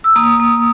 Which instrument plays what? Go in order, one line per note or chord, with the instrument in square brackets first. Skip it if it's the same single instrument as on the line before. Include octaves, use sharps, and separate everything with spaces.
[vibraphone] E6
A#3 D#6
A#3